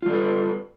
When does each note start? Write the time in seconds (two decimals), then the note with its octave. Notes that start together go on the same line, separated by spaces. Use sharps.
0.02 F4
0.06 G3
0.10 A4
0.13 B4